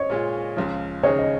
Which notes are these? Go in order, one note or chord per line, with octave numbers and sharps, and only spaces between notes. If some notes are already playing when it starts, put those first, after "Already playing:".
Already playing: C#5 D#5
A#2 G#3 F4
C#2 C#3 F3
D#2 C#3 G#3 D#4 G#4 C#5
D#5